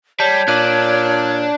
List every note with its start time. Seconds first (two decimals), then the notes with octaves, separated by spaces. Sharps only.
0.20 G3 C#5 A5 G6 B6
0.48 A#2 D4 D5 F#6 D#7 F#7